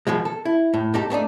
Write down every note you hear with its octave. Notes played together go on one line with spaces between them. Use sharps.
B2 D#3 F3 G#3
A4
E4
A2
B1 G#2 D#4 G4 A4
A3 B3 D4 D#4